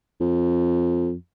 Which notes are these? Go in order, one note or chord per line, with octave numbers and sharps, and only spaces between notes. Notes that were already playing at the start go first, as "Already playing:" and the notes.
F2